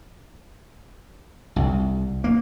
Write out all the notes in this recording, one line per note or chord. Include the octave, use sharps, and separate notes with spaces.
C2
A#3